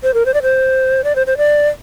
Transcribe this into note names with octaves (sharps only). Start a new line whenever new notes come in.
C5
A#4
C5
D5
C5
D5
C5
C5
D5